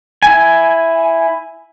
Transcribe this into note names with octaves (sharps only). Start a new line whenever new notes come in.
E4 G#5